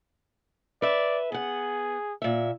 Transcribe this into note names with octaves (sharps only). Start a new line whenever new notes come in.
B4 D5 E5
B3 G#4 F#5
A#2 E5